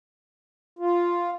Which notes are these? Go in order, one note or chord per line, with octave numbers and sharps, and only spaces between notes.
F4